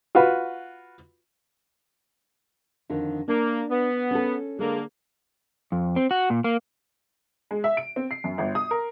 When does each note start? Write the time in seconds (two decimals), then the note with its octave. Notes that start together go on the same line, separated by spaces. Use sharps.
0.15 F4 F#4 B4
2.89 F2 D3 D#3
3.28 A#3 D4
3.70 B3
4.11 C#4 A4
4.59 D3 G#3 A#3
5.72 F2
5.96 C4
6.11 F#4
6.30 A#2
6.44 A#3
7.51 G#3
7.64 E5
7.77 D7
7.96 C4
8.11 C7
8.24 F#2
8.38 G1
8.55 D#6
8.71 A#4